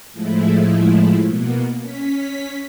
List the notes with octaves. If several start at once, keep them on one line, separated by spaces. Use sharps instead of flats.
A2 F3 G#3 A3 E4
B2 A#3 B3
C#4 B6